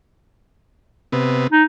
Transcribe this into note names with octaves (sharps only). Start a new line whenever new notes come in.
C3 B3
D#4